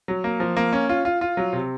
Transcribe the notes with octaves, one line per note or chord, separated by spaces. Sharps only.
F#3
A#3
F3
A#3
C#4
F4
F4
F4
F#3
C3